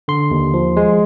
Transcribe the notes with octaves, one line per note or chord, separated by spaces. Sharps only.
D3 C6
D#2
F3
G#3